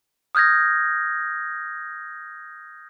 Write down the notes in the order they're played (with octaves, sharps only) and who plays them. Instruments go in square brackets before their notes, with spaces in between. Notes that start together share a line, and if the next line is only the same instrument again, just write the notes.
[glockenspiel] D#6 F6 G6 G#6 A#6